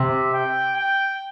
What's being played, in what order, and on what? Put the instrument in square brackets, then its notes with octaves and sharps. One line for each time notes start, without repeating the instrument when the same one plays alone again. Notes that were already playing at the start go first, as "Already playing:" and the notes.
Already playing: [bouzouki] C3 [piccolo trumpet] E5
[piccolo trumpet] G5
G5